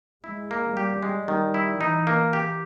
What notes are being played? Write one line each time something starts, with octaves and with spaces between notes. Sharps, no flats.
G#3 E4
A#3
G3 G4
G#3
D#3 G3
E4
E3 D#4
A#3
G4